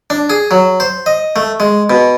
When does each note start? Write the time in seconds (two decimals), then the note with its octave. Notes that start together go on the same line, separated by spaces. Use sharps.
0.10 D4
0.30 G#4
0.51 F#3
0.80 C5
1.06 D#5
1.36 A3
1.60 G#3
1.90 B2